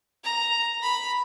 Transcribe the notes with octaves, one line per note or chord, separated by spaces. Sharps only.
A#5
B5